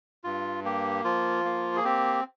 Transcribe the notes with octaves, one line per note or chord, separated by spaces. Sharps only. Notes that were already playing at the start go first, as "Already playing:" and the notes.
G2 F4
A#3 G4
F3 F4
A#3
G#4
C4 G4